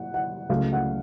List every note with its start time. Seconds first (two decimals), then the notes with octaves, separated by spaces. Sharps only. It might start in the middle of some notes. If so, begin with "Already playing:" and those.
Already playing: F#5
0.14 F#5
0.49 C#2 C#3 F#3 A3 F5
0.73 F#5